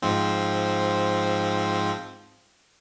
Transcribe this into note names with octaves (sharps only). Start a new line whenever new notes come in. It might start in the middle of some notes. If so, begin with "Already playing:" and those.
G#2 F3 C4